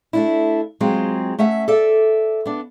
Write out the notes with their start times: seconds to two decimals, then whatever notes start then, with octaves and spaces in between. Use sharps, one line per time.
0.13 A3 D4 E4
0.80 F#3 G#3 C4 F4
1.39 A3 C#4 E5 F#5
1.68 A4 D5 E5
2.46 B3 D4